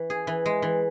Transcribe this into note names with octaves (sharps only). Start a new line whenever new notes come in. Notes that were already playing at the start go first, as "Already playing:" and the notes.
Already playing: E3
G#4
E3
G#3
E3